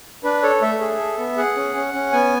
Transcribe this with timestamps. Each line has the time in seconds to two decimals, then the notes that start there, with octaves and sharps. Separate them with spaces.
0.24 D4 B4
0.43 A4 C#5
0.62 A3 E5
0.81 G#4
0.99 A4
1.18 B3
1.37 G#4 F#5
1.56 C#4
1.75 C#4
1.94 C#4
2.12 B3 G#5